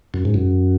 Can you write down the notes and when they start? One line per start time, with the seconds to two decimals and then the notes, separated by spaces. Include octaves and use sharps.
0.14 F#2
0.25 G#2
0.34 F#2